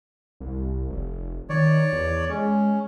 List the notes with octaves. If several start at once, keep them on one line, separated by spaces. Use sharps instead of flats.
C2
F1
D#3 C#5 D5
E2
G#3 C#4